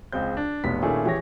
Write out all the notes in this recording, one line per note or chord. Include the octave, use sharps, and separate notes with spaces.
C#2 G#3 C4 G6
D4
F1 B1 B3 B6
A#2 D#3 A3 C#4 E4 G#4
E3 G4 G#4 C#5 A#6